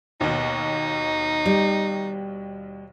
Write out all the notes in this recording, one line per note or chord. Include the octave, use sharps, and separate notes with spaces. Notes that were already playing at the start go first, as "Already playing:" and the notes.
D#2 B2 D#4
G3